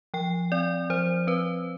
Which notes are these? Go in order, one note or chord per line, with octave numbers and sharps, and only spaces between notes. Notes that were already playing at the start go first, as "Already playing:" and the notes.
F3 G5
C4 D5
F3 C5
C4 B4